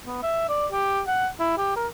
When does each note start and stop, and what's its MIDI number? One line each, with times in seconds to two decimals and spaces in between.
0.06 0.22 59
0.23 0.46 76
0.49 0.67 74
0.72 1.01 67
1.07 1.28 78
1.40 1.55 64
1.58 1.75 67
1.77 1.87 70